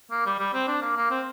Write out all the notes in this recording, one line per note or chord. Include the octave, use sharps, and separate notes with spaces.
A#3
G3
G3
C4
D4
A#3
A#3
C4